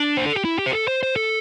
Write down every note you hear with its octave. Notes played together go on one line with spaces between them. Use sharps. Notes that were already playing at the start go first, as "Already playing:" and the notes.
Already playing: D4
C5
A4
G4
E4
G4
C5
A4
C5
C5
A4